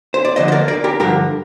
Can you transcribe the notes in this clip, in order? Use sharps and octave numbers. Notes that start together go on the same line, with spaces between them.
C5
D5
D2 D3 F3 C5 D#5
D#5
A#4 D5
A#4 D5
G4 A#4
G2 D3 F3 G4 A#4